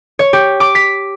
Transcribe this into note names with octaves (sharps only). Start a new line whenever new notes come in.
C#5
G4
D6
B6